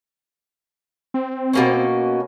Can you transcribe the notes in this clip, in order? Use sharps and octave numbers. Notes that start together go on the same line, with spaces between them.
C4
B2 A#3 C#4